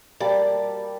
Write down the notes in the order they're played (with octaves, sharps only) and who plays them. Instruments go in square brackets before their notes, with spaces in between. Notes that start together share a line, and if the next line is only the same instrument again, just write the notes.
[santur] G3 A#3 A5 [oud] D5